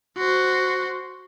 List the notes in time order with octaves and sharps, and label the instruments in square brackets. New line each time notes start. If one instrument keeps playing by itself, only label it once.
[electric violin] F#4 C5